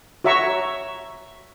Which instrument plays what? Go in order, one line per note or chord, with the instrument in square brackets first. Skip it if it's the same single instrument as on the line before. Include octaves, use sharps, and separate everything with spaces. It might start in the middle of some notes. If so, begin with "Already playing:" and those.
[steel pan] F#4 C#5 E5 A#5 C#6